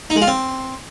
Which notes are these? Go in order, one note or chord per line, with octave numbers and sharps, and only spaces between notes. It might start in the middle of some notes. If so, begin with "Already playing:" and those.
D#4
G#3
F4
C4